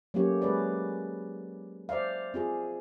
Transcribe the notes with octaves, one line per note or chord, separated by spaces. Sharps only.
F#3 A3 A#3 C#4 G4 C#5
G#3 G#4 B4 C#5 D5
C5 D5 E5 F5
C4 F4 G#4